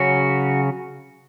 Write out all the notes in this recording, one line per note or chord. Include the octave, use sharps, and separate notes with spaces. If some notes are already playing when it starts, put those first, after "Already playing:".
Already playing: C#3 F#3 C#4 F#4